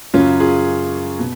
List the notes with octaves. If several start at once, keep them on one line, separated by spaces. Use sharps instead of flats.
F#2 C#3 F#3 C#4 F4
F4 G#4
B2